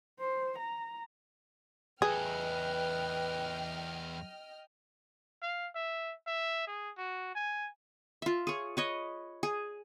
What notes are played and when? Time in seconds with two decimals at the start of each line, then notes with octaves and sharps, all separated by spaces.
0.20 C5
0.58 A#5
2.02 E2 G#4 A4 B4 D#5 G5 F6
5.42 F5
5.75 E5
6.27 E5
6.67 G#4
6.98 F#4
7.35 G#5
8.22 F4 E5
8.47 G#4 C#5
8.77 B4 C#5 D#5
9.43 G#4